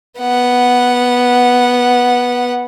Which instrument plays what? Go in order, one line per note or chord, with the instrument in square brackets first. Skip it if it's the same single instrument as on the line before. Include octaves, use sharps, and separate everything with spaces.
[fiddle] B3 F#5